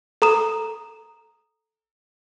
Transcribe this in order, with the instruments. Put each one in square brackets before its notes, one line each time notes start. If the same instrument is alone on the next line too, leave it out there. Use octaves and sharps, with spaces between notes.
[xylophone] A4 A#5 D#6 E7